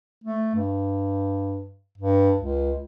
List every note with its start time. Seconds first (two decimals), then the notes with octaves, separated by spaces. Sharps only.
0.24 A3
0.55 G2
1.98 G2
2.37 C#2